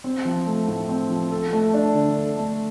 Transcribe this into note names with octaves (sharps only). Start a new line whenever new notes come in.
C4
F3
A3
A2
C4
F3
A4
A3
D4
D3
A4
A3